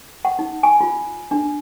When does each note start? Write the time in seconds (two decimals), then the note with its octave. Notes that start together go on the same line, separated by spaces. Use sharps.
0.25 F#5
0.39 D#4
0.63 G#5
0.81 F4
1.31 D4